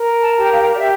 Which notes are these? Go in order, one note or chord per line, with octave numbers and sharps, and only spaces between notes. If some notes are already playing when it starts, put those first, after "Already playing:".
Already playing: A#4
A5
G4
G5
F5
D5
G4 E5